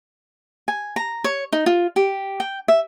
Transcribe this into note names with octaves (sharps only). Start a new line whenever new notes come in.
G#5
A#5
C#5
D#4
F4
G4
G5
E5